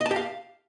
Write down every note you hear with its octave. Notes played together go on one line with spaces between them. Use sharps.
D#5
A5
G4
F5